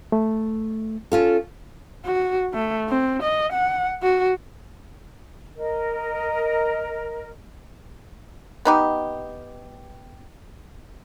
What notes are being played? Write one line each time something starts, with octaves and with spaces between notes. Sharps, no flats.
A3
C#4 F4 A4
F#4
A3
C4
D#5
F#5
F#4
A#4 D#5
B3 D#4 G4